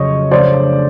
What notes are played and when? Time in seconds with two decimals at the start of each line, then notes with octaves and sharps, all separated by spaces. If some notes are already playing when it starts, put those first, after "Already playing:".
Already playing: F2 C#3 F#3 C#4 C#5 D#5
0.31 C#3 F3 A3 D4 C5 D5